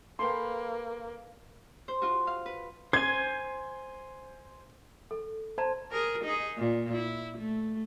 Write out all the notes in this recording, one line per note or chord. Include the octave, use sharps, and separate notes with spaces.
A#3 A4 B4 G5 C6
C5
F4 F#4
F5
B4
C5 G#5 G#6
A4
C5 D5 A5 A#5
G#4 A#4
D#4 G#4
A#2
E4
A3